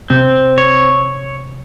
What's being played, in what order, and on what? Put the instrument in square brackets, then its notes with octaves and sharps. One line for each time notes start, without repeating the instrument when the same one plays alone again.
[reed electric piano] C3 [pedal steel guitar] C4
[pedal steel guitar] C#5